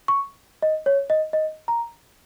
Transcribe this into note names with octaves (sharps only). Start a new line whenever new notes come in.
C#6
D#5
C#5
D#5
D#5
A#5